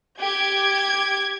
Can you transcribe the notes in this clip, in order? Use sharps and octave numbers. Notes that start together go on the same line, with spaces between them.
G4 D6 G#6